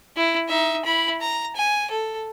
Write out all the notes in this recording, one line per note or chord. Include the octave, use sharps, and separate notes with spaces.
E4
D#4 E5
E4 B5
A#5
G#5
A4